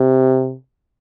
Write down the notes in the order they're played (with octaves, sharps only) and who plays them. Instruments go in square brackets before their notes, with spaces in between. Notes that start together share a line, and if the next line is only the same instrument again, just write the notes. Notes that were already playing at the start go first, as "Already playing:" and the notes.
Already playing: [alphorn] C3